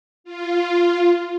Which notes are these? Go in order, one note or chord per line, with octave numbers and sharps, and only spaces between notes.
F4